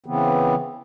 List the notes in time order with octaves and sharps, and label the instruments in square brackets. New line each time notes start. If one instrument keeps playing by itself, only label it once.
[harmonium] C#3 E3 B3 C4